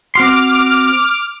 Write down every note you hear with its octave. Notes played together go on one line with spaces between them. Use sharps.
C4 F#4 C6 D6 F6